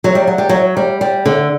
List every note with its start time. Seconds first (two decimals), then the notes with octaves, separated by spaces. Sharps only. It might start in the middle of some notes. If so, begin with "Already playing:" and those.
0.04 F#3
0.15 G3
0.27 F#3
0.38 G3
0.49 F#3
0.77 G3
1.01 G3
1.26 D3